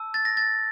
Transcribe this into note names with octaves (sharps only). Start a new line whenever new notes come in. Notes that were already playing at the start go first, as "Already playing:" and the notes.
Already playing: A5 E6
A6
A#6
A6